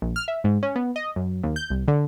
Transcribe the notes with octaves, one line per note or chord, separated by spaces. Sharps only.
A#1
F6
E5
G#2
C#4
B3
D#5
F#2
D#2
G6
C2
D3